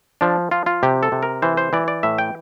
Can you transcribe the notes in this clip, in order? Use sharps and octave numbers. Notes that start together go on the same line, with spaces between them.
F3 D4
F3 F4
F4
C3 G4
A4
C3
A#4
E3 C5
C5
E3 D5
D5
A2 E5
G5